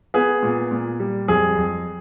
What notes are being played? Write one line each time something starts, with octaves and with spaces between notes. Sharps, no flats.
B3 G#4
A#2
A#2
G3
F2 G#4
F2